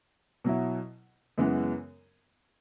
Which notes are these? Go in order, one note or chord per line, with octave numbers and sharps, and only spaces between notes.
B2 F#3 E4
F#2 C#3 E3 G#3 B3